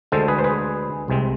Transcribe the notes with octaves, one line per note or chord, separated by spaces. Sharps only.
D2 D3 G#3 A4 C5
G#4 B4
C5
G#4 B4
C2 C3 G#3 C4